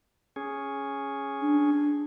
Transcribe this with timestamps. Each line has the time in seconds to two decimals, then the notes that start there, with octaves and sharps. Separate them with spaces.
0.36 C#4 G#4
1.42 D4